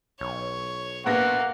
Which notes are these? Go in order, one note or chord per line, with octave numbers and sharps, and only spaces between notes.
B1 C#5
A#1 A#3 B3 F#5 A#6